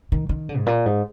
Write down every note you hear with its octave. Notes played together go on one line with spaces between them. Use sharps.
D#3
D#3
D3
G#2
A#2
G#2